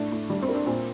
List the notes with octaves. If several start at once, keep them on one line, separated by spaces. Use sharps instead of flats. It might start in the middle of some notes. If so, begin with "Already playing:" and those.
Already playing: A2 D4
A2
G3 D4
C4
A#3
D4
A#2 C4